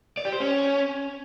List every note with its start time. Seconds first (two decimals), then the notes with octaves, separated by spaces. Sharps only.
0.17 D5
0.25 G4
0.33 C5
0.40 C#4